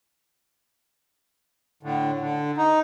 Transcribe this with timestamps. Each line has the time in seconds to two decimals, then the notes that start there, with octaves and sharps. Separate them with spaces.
1.83 A2 D3
2.21 D3
2.57 D#4